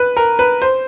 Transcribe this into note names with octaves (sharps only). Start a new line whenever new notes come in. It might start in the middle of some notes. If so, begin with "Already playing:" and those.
Already playing: B4
A#4
B4
C5